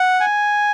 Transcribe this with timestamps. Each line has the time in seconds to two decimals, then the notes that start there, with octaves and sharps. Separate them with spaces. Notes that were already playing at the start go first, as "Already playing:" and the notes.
Already playing: F#5
0.20 G#5